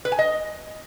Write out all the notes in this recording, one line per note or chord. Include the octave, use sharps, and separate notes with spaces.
B4
G#5
D#5